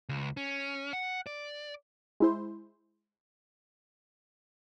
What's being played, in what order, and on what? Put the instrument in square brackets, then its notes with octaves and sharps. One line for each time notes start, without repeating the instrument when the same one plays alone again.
[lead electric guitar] C#2
C#4
F#5
D5
[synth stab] G#3 E4 C5